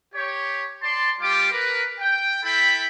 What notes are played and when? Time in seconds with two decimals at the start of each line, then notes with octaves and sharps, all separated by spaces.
0.15 G4 C#5
0.83 D5 A5 C6
1.21 G3 F4 G4 F5 D6
1.52 A#4 B4
1.99 G5
2.44 E4 A4 G5 B5